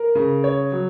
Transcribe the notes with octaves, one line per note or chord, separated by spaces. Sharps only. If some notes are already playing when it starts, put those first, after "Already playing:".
Already playing: A#4
C#3
C#5
F#3